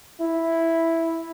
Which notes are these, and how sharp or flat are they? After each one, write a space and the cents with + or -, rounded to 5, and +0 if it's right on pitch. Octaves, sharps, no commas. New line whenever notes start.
E4 +0